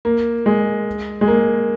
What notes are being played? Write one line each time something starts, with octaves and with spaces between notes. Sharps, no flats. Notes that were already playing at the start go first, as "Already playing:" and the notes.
A#3
G#3
G#3
A#3